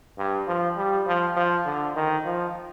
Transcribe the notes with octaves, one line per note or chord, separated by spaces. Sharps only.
G2
F3
G3
F3
F3
D3
D#3
F3